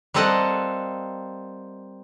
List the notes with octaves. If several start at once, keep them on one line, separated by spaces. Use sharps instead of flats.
G3 A#3 C4 A4 D#5 F#5